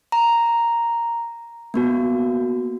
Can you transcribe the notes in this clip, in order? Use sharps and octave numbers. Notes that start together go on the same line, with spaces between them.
A#5
A#3 B3 F#4